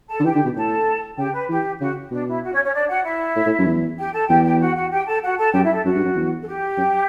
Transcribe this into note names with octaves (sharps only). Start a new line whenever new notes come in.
A4 A5
D3
E3 G4 G5
D3
B2
A2 A4 A5
C#3 G4 G5
B4
E3 G4
C#3 F#4
B2 D4
E4
F#4
C#4 C#5
C#4 C#5
D4 D5
F#4 F#5
E4 E5
A2
A2
F#2
E2
G4 G5
A4 A5
E2 G4 G5
G4 G5
F#4 F#5
F#4 F#5
G4 G5
A4 A5
F#4 F#5
A4 A5
F#2 G4 G5
E4 E5
A4
F#2 F#4
G2
F#2
E2
A4
G4
F#2